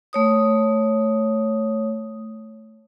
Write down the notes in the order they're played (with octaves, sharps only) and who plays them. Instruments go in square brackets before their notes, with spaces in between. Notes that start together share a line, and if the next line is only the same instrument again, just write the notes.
[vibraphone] A3 C#5 D#6